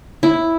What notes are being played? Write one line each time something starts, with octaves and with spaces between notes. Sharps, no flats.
E4